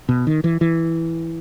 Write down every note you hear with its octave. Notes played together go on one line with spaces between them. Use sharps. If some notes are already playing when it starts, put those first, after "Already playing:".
B2
D#3
E3
E3